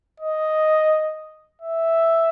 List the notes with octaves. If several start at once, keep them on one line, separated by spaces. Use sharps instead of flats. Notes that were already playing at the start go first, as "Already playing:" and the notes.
D#5
E5